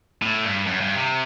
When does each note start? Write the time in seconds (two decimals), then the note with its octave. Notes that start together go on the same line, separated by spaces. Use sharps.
0.22 A2
0.44 G2
0.67 F#2
0.81 G2
0.95 C3